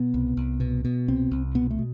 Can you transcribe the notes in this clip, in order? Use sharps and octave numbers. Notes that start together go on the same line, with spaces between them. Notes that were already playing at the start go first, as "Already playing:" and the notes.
Already playing: B2 B3
C2
C2
B2
B2
C2 C4
C2
B2 B3
A3
B2